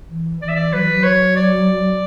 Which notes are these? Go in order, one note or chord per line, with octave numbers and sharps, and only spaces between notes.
E3
E3 D5
E5
D5
F#3 B4
E3
F#3
C#5
D5